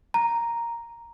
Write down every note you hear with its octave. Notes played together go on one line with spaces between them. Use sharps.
A#5